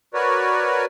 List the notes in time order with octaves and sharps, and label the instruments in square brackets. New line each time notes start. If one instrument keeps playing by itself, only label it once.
[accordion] F#4 A#4 B4 C#5 D5